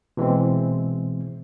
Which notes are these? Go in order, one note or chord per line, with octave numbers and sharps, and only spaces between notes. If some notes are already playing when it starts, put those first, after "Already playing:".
B2 E3 G#3 C4